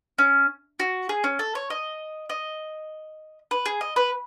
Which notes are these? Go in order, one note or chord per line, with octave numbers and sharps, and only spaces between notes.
C#4
F#4
G#4
C#4
A4
C#5
D#5
D#5
B4
G#4
D#5
B4